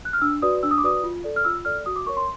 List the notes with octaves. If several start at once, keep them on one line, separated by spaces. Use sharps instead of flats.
F#6
F6
D4 E6
F#4 B4 D5 D#6
D4 E6
D#6
D6
F#4 B4 D5 D#6
F4
A4 D5
F6
F4 E6
A4 D5 F6
F#4 D#6
D6
A#4 C#5 C#6
C6